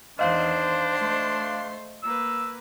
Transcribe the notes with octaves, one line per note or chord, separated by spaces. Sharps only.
E2 D#3 D4 C5 D#5 F5 C6
A3 C6
A#3 B4 E6